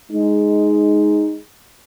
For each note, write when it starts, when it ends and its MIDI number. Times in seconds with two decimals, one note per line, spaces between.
0.12 1.35 56
0.12 1.35 63